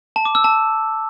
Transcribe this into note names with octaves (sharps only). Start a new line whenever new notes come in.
A5
D6
E6
A5